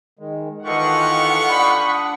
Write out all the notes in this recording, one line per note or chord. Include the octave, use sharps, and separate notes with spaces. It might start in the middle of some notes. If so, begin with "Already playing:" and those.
D#3 G#3
D#3 E3 F4 G4 A4 D#5 F#5 C#6
D4 B5 D#6